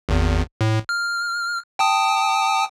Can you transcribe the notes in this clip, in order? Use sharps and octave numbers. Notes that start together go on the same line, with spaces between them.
G#1 E2
A2
F6
G5 A5 D#6